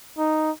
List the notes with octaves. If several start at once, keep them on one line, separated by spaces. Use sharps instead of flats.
D#4